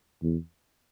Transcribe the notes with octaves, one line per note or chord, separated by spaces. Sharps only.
E2